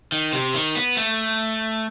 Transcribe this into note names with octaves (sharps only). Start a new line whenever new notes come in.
D#3
C3
D#3
B3
A3